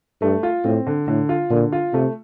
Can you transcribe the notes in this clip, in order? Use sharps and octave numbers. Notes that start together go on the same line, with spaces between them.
G2 A3
F4
A2 C4
D3
A2 D3
F4
A#2 D3
F4
C3 A3